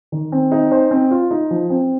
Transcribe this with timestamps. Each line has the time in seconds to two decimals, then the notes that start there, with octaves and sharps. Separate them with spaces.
0.12 D#3
0.32 C4
0.52 D#4
0.71 C5
0.91 C4
1.11 F4
1.31 D#4
1.51 F3
1.70 C4